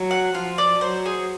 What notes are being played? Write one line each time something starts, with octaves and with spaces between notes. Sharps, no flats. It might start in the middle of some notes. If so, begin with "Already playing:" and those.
Already playing: F#3
F#5
F3 F4
D5
F#3 C5
G#4